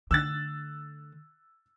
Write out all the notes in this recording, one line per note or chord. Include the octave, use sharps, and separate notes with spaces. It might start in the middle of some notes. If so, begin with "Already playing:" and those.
D3 A3 E6 F#6 A6